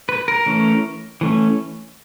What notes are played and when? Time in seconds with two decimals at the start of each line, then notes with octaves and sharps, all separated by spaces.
0.09 B4
0.28 A#4
0.46 E3 A3 C#4
1.21 E3 A3 C#4